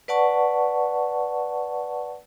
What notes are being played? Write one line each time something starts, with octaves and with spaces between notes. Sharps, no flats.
B4 D5 F#5 A5 C#6